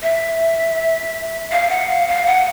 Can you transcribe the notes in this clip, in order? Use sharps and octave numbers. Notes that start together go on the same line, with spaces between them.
E5
F5
F#5
F5
F5
F#5